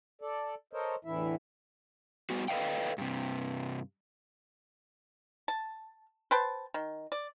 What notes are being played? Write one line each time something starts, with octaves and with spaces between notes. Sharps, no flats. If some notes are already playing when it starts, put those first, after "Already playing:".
A4 D5
A4 A#4 C5 C#5 D#5
E2 A2 D3 E3 E4 E5
G3 B3 F#4
A4 B4 D#5 F5 G5
G2 C3
A5
B4 C5 G5 A5
D#3
D5